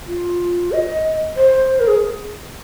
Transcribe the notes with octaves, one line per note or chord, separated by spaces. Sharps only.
F4
D#5
C5
A#4
G#4